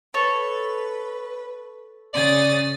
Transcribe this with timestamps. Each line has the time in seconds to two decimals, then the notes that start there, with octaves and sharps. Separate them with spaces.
0.14 A4 B4 C#5
2.14 C#3 D5 D#6 A6